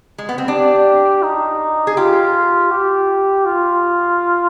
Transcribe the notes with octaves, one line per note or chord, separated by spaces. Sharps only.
G#3
B3
C4
D4 G4
D#4
G#4
F4 G4
G4
F4